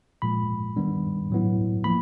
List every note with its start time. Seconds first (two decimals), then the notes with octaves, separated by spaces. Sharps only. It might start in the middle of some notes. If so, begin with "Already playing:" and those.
0.22 A#2 F3 G#3 B5
0.76 D#3 G3 B3 D4
1.30 A2 F#3 B3 E4
1.84 F3 A#3 B5